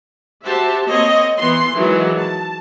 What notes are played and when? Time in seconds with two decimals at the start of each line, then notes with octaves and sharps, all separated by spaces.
0.45 F#4 G4 C5 E5 A5
0.88 A#3 C4 C#5 D#5
1.39 E3 B3 C6
1.75 D#3 E3 F#3 G#3
2.17 A5